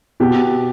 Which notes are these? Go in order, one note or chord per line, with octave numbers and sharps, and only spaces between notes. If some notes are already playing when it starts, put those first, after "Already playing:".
B2 G4